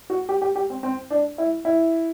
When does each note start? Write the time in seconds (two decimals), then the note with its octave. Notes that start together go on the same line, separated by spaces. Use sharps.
0.10 F#4
0.29 G4
0.42 G4
0.55 G4
0.70 C4
0.83 C4
1.10 D4
1.38 E4
1.65 E4